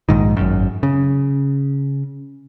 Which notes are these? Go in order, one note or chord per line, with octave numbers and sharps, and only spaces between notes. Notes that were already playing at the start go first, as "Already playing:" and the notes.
A#1 G#2 D#3
G#1 F#2
C#3